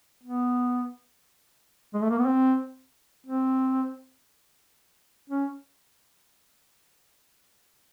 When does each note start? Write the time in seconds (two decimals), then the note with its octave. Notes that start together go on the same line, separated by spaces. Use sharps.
0.23 B3
1.94 G#3
2.02 A3
2.10 A#3
2.19 B3
2.26 C4
3.27 C4
5.30 C#4